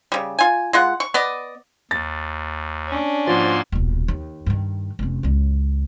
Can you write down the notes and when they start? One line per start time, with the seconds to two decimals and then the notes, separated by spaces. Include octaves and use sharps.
0.12 C#3 G3
0.39 F4 G#5
0.73 G#3 F4 F#5
1.00 C#6
1.14 B3 D5 D#5
1.91 D#2 A6
2.88 C#4 D4
3.27 G#2 F3 A#3 F#4 C6 A6
3.72 D#1 B1
4.08 D#2 D#3
4.46 G2 D#3
4.99 F1 C#4
5.23 C#2 F#2